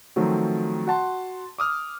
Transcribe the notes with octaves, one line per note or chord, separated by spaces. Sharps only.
D#3 F3 F#3 A3 C4
F#4 F#5 A5 C6
D6 D#6 F6